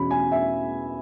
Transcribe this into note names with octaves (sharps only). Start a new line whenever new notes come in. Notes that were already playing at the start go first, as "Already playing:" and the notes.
Already playing: E2 B2 C#4 B5
G#5
E5